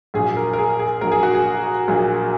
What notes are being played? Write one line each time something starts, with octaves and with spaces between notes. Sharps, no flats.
A#1 A#2 F#3 G#4
A#4
A#4
G#4
G#4
A#1 A#2 F#3 A#4
G#4
F#4
G#4
A#1 A#2 F#3